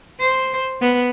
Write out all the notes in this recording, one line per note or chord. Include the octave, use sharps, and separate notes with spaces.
C5
B3